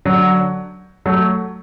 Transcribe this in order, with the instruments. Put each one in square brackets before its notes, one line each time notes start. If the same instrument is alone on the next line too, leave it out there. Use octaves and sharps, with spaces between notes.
[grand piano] D3 F#3
F#3 A3